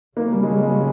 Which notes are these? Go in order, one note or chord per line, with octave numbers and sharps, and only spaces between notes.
C#3 F#3 A3 A#3 C#4
G3
G#3
G3
G#3